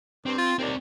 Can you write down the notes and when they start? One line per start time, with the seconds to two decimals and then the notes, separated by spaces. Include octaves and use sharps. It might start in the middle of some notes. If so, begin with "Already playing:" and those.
0.26 G2 C4
0.38 F4
0.59 D#2 C4 D5